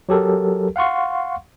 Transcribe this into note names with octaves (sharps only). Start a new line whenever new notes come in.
F#3 G4 A4 A#4
F5 F#5 C6 C#6